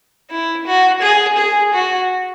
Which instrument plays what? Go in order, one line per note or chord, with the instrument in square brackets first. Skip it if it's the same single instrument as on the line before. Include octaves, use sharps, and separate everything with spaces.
[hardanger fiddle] E4
F#4
G#4
G#4
F#4